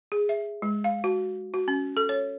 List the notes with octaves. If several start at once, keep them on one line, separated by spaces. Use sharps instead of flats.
G#4
E5
G#3
F5
F#4
F#4
C#4
A4
C#5